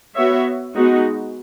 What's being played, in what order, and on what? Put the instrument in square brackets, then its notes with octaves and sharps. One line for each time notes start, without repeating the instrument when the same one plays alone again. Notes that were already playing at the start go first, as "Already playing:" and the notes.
[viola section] B3 F#4 C#5 E5
G#3 B3 D#4 F#4